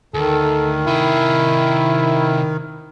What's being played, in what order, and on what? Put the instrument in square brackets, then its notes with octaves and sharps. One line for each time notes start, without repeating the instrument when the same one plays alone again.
[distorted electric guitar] D2 [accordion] D#3 [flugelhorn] A4
[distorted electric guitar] C3 G#4 [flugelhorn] E4